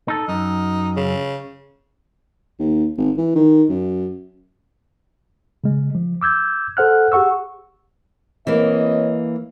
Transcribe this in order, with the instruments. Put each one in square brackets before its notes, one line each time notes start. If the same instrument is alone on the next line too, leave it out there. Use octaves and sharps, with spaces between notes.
[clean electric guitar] D#4 A4
[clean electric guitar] F#2 [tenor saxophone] D#4
[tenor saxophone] C#3
[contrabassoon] D#2
G#1
E3
D#3
F#2
[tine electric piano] C#3 G#3
F3
D6 E6 G6 G#6
A4 C5 F#5 F6 F#6
G4 G#4 F#5 C#6 E6
[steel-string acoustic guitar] E3 A#3 [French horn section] C4 C#5 D#5